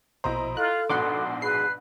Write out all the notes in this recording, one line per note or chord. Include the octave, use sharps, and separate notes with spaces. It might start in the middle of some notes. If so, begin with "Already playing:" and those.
A#1 B2 E4 C5 D#5 A#5
F4 A4 F#6
A#1 G#2 B2 B3 F#5 C6 D6
G#4 B4 C7